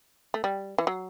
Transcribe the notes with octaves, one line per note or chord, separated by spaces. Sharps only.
A3
G3
E3
F#3